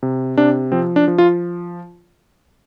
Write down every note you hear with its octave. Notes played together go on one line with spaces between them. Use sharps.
C3
C3 D4
F3 C4
D4
F3
F4